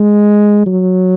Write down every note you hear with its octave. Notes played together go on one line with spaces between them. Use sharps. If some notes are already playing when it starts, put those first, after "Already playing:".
Already playing: G#3
F#3